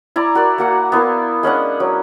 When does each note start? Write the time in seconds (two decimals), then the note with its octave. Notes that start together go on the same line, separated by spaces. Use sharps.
0.16 E4 D5 A#5
0.35 F#4 A#4 D5
0.58 A#3 F#4 F#5
0.92 B3 E4 A#4 F5
1.43 G#3 C#4 D4 F#5
1.80 F#3